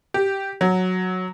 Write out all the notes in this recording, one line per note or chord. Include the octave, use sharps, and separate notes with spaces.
G4
F#3